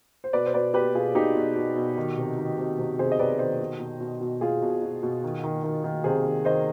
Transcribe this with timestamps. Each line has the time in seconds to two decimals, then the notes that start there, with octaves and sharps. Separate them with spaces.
0.24 C5
0.33 B2 B4 D5
0.46 C5
0.54 B2 B4 D5
0.74 B2 G4 B4
0.95 B2 F4 G#4
1.15 B2 D#4 G4
1.35 B2
1.56 B2
1.76 B2
1.97 D#3
2.18 C3
2.38 D#3
2.58 C3
2.79 C3
2.99 C3 G#4 C5
3.12 D#5
3.19 C3 B4 D5
3.39 D#3 C5 D#5
3.60 B2
3.80 B2
4.00 B2
4.21 B2
4.41 B2 F4 G#4
4.62 B2
4.82 B2
5.03 B2
5.24 D#3
5.44 D#3
5.64 D#3
5.84 D#3
6.04 C3 G#4 C5
6.25 D#3
6.45 D#3 C5 D#5